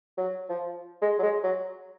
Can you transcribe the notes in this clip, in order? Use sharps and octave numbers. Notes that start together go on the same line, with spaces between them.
F#3
F3
G#3
F#3
G#3
F#3